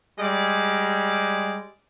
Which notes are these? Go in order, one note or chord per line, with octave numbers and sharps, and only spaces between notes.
G3 G#3 D5